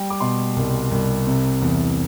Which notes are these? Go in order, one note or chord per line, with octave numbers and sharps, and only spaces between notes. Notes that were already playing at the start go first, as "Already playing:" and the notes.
Already playing: G3 G5
D6
B2 C6
C2
C2
C3
E2